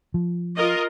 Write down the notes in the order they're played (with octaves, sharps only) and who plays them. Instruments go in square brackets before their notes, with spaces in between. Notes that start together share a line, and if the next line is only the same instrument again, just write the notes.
[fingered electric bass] F3
[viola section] F4 A#4 D#5